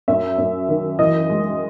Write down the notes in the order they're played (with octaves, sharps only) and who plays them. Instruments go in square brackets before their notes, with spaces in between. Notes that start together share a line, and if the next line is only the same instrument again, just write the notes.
[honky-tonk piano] F#2 E5
F#2
D#3
E3 D#5
G#3